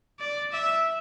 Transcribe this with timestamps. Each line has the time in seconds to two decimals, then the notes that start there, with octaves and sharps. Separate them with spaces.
0.20 D5
0.52 E5